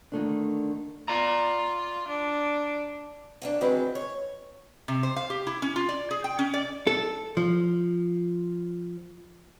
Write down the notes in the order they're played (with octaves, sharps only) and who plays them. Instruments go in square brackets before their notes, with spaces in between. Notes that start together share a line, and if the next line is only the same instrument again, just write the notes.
[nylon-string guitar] D3 D#3 A3 D4
[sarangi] F4 [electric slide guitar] D5 A#5
[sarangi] D4
[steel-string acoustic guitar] A#3 C#4 D4
D#3 E3 F#3 G#3 C4 B4
C#5
[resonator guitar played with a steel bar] C3
C5
F5
G4
E4
C#4
F4
D5
G#4
G5
C#4
D5
[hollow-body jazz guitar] A4
F3